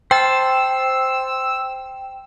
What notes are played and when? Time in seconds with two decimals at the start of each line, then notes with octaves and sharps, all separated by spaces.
0.11 C5 G5 A5 E6